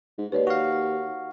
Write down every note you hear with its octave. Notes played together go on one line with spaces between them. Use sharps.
G#2
D#2 B4 C#5 D5
F#4 F5